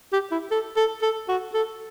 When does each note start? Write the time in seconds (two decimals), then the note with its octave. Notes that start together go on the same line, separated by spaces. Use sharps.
0.12 G4
0.31 E4
0.51 A4
0.77 A4
1.02 A4
1.28 F#4
1.54 A4